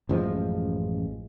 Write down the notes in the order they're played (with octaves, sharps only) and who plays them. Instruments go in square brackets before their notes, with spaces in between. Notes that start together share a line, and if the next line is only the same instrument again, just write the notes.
[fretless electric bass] A1 F#2 F3 G#3